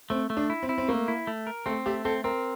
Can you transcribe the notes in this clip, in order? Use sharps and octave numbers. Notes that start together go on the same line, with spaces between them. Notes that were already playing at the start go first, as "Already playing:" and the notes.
A3 C4
A3
D4
E4
C4
E4
C4
A3 A#3
E4
A3
A#4
A3 C4
A3 G4
C4 A4
C4 A#4